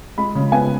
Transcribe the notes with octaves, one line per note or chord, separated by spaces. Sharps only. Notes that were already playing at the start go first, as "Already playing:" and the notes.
G#3 B5
C#3
B3 G#5